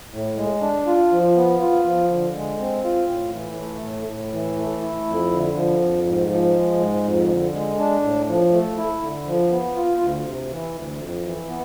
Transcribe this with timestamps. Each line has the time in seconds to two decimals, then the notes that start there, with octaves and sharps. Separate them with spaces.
0.12 A2
0.37 G#3
0.62 D4
0.86 F4
1.11 F3
1.36 B3
1.61 F4
1.85 F3
2.10 D3
2.35 G#3
2.59 C4
2.84 F4
3.09 A2
3.34 E3
3.58 A3
3.83 A2
4.08 A2
4.33 E3
4.57 A3
4.82 E4
5.07 F2
5.32 D3
5.56 F3
5.81 F2
6.05 G#2
6.30 F3
6.55 G#3
6.80 G#2
7.04 F2
7.29 D3
7.54 G#3
7.79 D4
8.03 A2
8.28 F3
8.53 A3
8.77 E4
9.02 D3
9.27 F3
9.51 B3
9.76 F4
10.01 D2
10.26 C3
10.51 E3
10.75 D2
11.00 F2
11.25 E3
11.49 B3